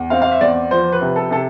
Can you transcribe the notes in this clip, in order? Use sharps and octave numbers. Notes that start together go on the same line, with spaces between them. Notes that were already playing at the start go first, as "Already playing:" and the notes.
Already playing: E2
C4 F5
F5
E5
E2 D5
F3 C5
B4
C3
A4
C3 A4